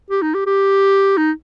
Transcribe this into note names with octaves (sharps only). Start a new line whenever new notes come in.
G4
D#4
G4
G4
D#4